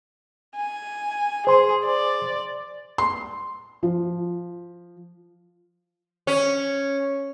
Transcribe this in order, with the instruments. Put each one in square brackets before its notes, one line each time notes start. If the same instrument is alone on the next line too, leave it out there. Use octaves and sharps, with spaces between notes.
[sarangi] G#5
[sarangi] G#4 [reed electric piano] C5 C6
[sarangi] D5
[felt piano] C6
F3
[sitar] C#4